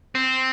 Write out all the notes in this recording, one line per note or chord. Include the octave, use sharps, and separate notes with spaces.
C4